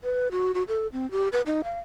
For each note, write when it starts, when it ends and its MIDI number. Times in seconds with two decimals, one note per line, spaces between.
0.04 0.28 71
0.32 0.52 66
0.54 0.63 66
0.68 0.87 69
0.93 1.10 60
1.11 1.28 67
1.33 1.42 71
1.46 1.61 63
1.64 1.78 77